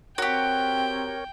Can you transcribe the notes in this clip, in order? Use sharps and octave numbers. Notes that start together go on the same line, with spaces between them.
C4 F#4 G4 A#4 C#5 G5